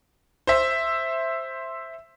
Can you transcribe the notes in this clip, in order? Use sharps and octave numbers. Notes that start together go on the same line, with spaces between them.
C5 E5